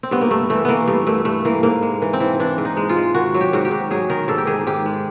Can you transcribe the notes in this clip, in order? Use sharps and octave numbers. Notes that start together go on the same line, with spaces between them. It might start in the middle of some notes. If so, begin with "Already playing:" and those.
C4
G2 B3
A#3
G2 A3
E3 A3
E3 A#3 B3
G2 A3
G2 A3
G2 A3
E3 A#3
G#2 A#3
G#3
E3
C4
E3
E3 D4
G#2
D#4
G#3
F4
G#3
D#3 F#4
F#3
G4
G#2 F#4
G4
G#2
F#3 G#4
D#3 A#4
G#2 A4
G4
D#3 G#4
G#2 G4
G#3